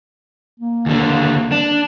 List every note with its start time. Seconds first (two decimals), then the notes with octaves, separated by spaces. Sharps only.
0.60 A#3
0.86 D#2 D3
1.52 D4